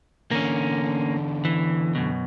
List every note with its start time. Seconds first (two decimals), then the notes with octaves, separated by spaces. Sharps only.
0.31 E2 D3 A#3 C#4
1.45 E3
1.95 F#2 B2